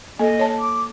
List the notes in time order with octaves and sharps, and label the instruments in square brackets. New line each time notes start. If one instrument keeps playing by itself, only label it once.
[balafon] A#3 A4 [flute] D#5
[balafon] C#5 A5
[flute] D6